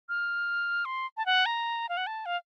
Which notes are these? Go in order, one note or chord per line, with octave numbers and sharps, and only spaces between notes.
F6
C6
A5
F#5
A#5
F5
F#5
A5
F5